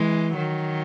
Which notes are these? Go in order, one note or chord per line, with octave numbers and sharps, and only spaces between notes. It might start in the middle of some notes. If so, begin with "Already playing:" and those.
Already playing: E3 G#3
D#3 F#3